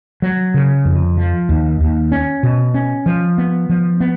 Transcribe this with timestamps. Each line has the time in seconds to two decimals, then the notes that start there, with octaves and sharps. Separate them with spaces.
0.22 F#3
0.54 C#3
0.85 F2
1.17 F3
1.49 D#2
1.80 D#2
2.12 C#4
2.43 B2
2.74 C#4
3.06 F3
3.38 B3
3.70 F3
4.00 B3